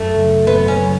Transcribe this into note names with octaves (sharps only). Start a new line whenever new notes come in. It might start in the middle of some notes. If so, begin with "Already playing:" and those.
Already playing: F#2 A3
C#3 F#3
F#2 B3
C#4
C#3 F#3